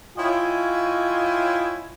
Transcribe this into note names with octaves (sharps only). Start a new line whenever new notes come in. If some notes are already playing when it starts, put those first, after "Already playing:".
E4 F4 C#5 D#5 G5 G#5